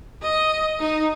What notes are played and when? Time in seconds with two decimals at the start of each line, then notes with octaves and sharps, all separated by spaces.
0.22 D#5
0.80 D#4